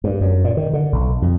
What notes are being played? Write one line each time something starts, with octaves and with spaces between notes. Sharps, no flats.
G2
F#2
A#2
D#3
D3
B1
F2